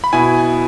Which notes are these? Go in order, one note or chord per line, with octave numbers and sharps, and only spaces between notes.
B5
B2 B3 E4 G#5